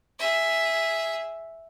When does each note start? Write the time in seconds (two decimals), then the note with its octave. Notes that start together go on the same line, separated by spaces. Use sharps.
0.19 G#4 E5